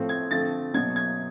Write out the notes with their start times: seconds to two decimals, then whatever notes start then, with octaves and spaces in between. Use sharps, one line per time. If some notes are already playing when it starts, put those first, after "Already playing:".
Already playing: A2 F3 A3 C4
0.09 G#6
0.31 D3 F3 A3 C4 A6
0.74 B2 F#3 B3 G#6
0.96 G#6